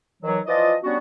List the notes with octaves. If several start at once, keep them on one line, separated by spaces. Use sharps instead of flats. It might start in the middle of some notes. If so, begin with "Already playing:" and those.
D#3 E3 F#3
E3 F3 F4 D5 D#5
F#3 G3 B3 C#4 D4 F#4